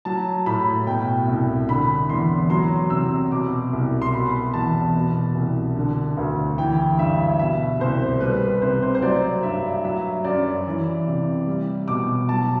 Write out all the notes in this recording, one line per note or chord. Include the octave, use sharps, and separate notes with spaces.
F#3 A5
A2 B5
B2 G5
C2
D3 B5
E2 C6
F#3 C6
C3 E6
B2 D6
C2
C6
B2 B5
E2 A5
B2
C2
D3
D2
E3 G5
G2 E5
B2 E5
C2 C5
G3 B4
B4
C3 C5
C5
C5
F#3 D5
G2 E5
F#3 E5
F#2 D5
E3
C3
G3
B2 D6
F#3 A5